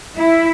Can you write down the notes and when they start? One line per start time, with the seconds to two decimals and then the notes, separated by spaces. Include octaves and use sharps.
0.17 E4